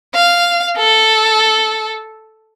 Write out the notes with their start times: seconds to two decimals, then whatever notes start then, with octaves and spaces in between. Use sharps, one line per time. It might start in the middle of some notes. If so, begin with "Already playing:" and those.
0.15 F5
0.78 A4